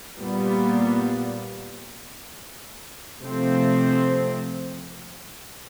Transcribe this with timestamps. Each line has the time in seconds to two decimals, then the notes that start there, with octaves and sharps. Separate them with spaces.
0.19 A#2 G3 B3
3.22 C3 F3 A3 C4